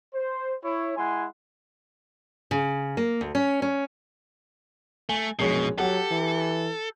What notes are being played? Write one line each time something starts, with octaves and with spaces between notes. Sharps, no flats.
C5
E4 C#5
G#3 E4 F#5 G#5 C6
C#3
A#3
D2
C#4
C#4
A3 G#5
A#1 F#2 B2 G#3 C#5
F#3 G4 A4 F#5
E3